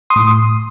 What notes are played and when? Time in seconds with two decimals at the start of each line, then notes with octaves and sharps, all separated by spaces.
0.10 C6 D#6
0.16 A2